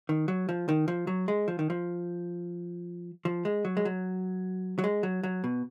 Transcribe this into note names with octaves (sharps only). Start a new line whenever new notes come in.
D#3
F#3
F3
D#3
F3
F#3
G#3
F3
D#3
F3
F3
G#3
F#3
G#3
F#3
F#3
G#3
F#3
F#3
B2